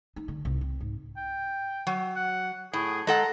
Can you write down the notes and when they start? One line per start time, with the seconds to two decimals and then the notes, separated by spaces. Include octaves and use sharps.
0.16 D#4
0.28 D3
0.45 C2
0.61 C4
0.80 G#2
1.17 G5
1.87 F#3
2.16 F#5
2.73 A2 G#4
3.07 G#3 A4 F#5 A#5